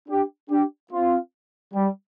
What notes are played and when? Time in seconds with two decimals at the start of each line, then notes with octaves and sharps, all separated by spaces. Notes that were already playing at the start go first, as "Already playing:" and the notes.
0.09 D4 G4
0.50 D4 G4
0.92 C4 F4
1.74 G3